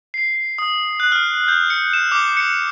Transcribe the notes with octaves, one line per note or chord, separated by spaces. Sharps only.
C7
D#6
F#6
F6
G6
C#7
E7
D6
C#7